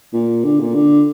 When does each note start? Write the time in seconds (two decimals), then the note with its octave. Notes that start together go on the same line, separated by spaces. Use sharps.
0.13 A#2
0.44 D3
0.60 A#2
0.74 D3